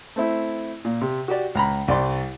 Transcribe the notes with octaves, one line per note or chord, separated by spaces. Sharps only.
A3 C4 E4
A#2
C3
F#4 G4 D5
C#2 A#5 B5
C2 D5 C6